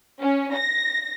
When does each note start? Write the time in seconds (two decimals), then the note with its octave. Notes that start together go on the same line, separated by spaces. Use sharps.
0.21 C#4
0.55 A#6